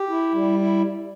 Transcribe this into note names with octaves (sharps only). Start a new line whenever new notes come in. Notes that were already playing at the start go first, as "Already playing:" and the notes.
Already playing: G4
E4
G3
E4